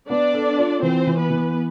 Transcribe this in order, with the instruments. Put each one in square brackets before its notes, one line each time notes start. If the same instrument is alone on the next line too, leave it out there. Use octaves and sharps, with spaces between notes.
[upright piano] B3 [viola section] D4 D5
[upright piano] A4
F4
[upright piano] E3 [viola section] C4 C5
[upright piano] E3
[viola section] B3 B4
[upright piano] E3